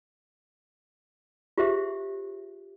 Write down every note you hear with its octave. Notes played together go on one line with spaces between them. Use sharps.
F4 G4 G#4 C5 E5